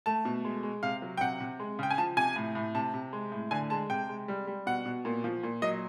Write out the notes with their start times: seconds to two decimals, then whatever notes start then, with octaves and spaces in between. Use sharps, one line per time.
0.06 A3 A5
0.25 B2
0.45 G#3
0.63 G#3
0.83 C3 F5
1.02 F#3
1.17 G5
1.21 C3 F#5
1.40 C3
1.60 G#3
1.79 C#3 G5
1.90 G#5
1.98 F3 A5
2.17 C3 G#5
2.36 A2
2.55 A2
2.75 C3 A5
2.94 C3
3.13 G#3
3.32 A2
3.51 D3 G#5
3.70 G#3 A5
3.90 C3 G5
4.09 G#3
4.28 G3
4.47 G3
4.66 B2 F#5
4.85 B2
5.05 A#2
5.24 F3
5.43 A#2
5.62 F#3 D#5